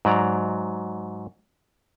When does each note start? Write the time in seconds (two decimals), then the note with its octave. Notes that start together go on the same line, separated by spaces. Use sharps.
0.05 G#2 F#3 D5 A#5